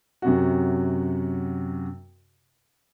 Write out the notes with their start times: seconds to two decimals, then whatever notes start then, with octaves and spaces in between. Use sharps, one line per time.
0.22 F#2 C3 F#4